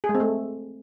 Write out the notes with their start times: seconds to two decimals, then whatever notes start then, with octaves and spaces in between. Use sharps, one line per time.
0.04 G#4
0.09 G#3
0.15 C4
0.20 A3